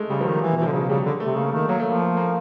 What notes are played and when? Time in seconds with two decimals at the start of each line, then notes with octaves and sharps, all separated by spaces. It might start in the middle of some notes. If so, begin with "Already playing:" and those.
Already playing: G#3 A3
0.10 C#3 G3
0.21 F3
0.25 D#3 F#3
0.41 E3
0.52 B2
0.57 E3 F3
0.67 D3
0.73 C#3 F#3
0.89 C#3 G3
1.06 D3
1.20 A3
1.26 C3
1.36 C#3 A#3
1.52 D#3 A3
1.68 F#3 A#3
1.80 A3
1.85 F3 A#3
2.00 A3
2.17 A#3